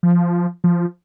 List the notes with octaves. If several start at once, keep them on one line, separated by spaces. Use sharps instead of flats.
F3
F3